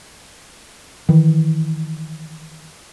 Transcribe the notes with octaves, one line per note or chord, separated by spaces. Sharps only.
D#3 E3